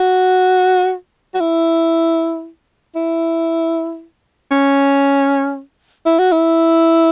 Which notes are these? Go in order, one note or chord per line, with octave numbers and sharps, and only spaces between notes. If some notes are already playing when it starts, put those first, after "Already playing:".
Already playing: F#4
F#4
E4
E4
C#4
E4
F#4
E4